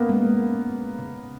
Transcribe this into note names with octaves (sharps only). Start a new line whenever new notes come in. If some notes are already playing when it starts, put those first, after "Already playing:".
Already playing: A#3 B3 C#4
G#3
C#4
G#3
C#3